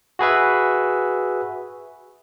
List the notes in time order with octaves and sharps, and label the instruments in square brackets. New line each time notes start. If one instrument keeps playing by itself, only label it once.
[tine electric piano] F#4 G#4 B4 E5